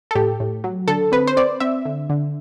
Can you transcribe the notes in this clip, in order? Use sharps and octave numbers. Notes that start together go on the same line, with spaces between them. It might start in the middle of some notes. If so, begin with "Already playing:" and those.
A4
A2 G4
A2
F#3
D3 A4
C4 B4
C5
C4 D5
C4 E5
D3
D3